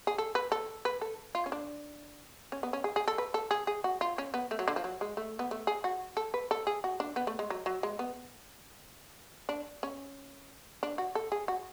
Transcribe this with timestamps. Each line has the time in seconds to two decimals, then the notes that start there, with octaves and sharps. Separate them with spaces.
0.07 G#4
0.18 A4
0.35 B4
0.52 A4
0.85 B4
1.01 A4
1.35 F4
1.46 C#4
1.52 D4
2.52 C#4
2.63 B3
2.73 C#4
2.84 G#4
2.96 G#4
3.08 A4
3.18 B4
3.34 A4
3.51 G#4
3.67 G#4
3.84 F#4
4.01 F4
4.18 C#4
4.34 B3
4.51 A3
4.59 F#3
4.68 D3
4.76 F3
4.84 F#3
5.01 G#3
5.17 A3
5.39 B3
5.51 A3
5.67 G#4
5.84 F#4
6.17 A4
6.34 B4
6.51 A4
6.67 G#4
6.84 F#4
7.00 D4
7.16 B3
7.27 A3
7.39 G#3
7.50 F#3
7.66 F#3
7.83 G#3
7.99 B3
9.49 D4
9.83 C#4
10.83 D4
10.98 F#4
11.15 A4
11.32 G#4
11.48 F#4